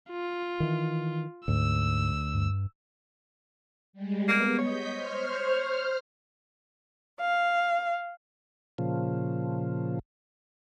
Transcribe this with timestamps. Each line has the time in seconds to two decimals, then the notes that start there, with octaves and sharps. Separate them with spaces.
0.11 F4
0.60 D#3 E3
1.48 D2 G#2 E6
2.34 G2
3.93 G3 G#3
4.28 A#3 B3
4.59 C#5 D#5 G6 B6
4.91 C5 F6
7.19 F5
8.78 A#2 C#3 F3